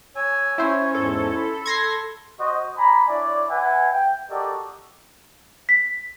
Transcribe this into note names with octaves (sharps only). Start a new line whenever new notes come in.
C#5 G#5 E6
C#4 E4 C5
E2 G#2 A4
B5
C6 G#6 A#6 C7
F#4 C5 D#5
D5 G#5 A#5 B5
D4 E4 C#5 D5
B4 E5 F#5 G#5
G5
F#4 G4 A4 A#4 D5 D#5
B6